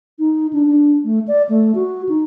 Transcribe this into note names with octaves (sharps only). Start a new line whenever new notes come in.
D#4
D4
D4
A3
D5
A3
F#4
D#4